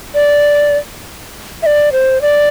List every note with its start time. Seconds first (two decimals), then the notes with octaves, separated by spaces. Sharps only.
0.15 D5
1.63 E5
1.66 D5
1.92 C5
2.22 D5